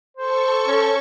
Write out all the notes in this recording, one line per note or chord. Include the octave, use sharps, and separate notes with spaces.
A4 C5 C#6
C#4